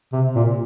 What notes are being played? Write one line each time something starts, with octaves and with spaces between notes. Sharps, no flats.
C3
A#2